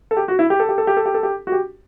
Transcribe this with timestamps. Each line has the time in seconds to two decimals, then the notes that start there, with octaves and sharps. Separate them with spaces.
0.11 A4
0.17 G4
0.28 F#4
0.39 E4
0.50 G4
0.60 A4
0.69 G4
0.78 A4
0.87 G4
0.97 A4
1.06 G4
1.14 A4
1.23 G4
1.47 F#4
1.52 G4